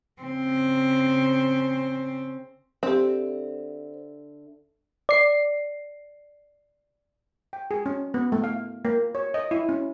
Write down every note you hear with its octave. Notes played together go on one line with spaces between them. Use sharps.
C#3 C4
D3 C4 G4 E5 C6
D5 C7
G5
G#4
C#4
B3
A3
F5
A#3
C#5
D#5
E4
C#4